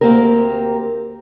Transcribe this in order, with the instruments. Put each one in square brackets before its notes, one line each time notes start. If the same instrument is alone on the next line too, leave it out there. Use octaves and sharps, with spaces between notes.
[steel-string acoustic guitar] D2 A#2 A#3 C4 G4 A#4